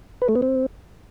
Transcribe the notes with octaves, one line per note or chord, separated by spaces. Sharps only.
B4
A3
B3
C4